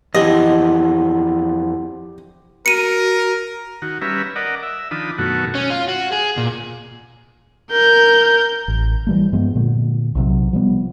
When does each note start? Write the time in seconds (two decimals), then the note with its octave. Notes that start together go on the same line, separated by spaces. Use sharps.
0.15 F2 E3 E4 G4 D#5 F#5 C6
2.66 F#4 A#4 C#7 D#7
3.82 D#3 F#4
4.02 G3 C#4 B4 E5 A#5
4.36 A#4 D5 D#5 F#5
4.63 E5
4.91 D#3 F3 D4 B5 D#6
5.18 F#2 B2 D#3 A3 F#4
5.55 C#4
5.70 F4
5.88 F#4
6.12 G#4
6.37 A#2
7.71 A#4 G6
8.68 A1
9.07 E3 G3 A3
9.32 G2 F3 G#3 B3
9.55 A#2 D3
10.15 B1 C3 F#3
10.53 F3 G3 B3